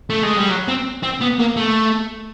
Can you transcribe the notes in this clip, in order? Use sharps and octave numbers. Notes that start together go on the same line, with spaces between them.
A3
G#3
G3
F#3
C4
C4
B3
A#3
A3